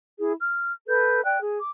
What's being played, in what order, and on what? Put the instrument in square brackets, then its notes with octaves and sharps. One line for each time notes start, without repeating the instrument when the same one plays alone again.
[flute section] E4 G#4
F6
A4 B4 G6
D5 G5 F#6
G#4
D6